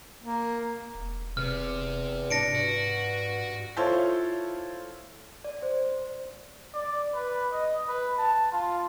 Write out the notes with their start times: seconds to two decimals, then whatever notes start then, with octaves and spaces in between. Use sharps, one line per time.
0.23 A#3
0.95 E1
1.37 E2 C3 F6
2.30 G#2 D4 A#6 C#7 D7
2.55 G2 F#4
3.76 E4 F4 A4 C5 C#5
5.44 D5
5.62 C5
6.74 D5
7.14 B4
7.52 D#5
7.88 B4
8.18 A5
8.52 F4